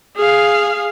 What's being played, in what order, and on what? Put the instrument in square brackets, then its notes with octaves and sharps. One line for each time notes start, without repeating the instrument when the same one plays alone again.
[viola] G#4 F5